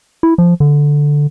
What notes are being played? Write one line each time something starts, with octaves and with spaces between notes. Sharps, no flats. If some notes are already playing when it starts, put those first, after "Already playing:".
E4
F3
D3